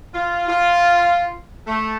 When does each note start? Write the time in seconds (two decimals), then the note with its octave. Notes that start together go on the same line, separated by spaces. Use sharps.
0.14 F4
0.48 F4
1.67 A3